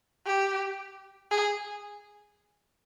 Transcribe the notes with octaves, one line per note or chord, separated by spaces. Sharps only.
G4
G#4